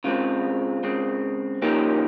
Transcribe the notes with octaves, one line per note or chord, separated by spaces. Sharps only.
C#3 G#3 C4 F4
C#3 G#3 C4
A#2 F3 A#3 C#4 D#4 G4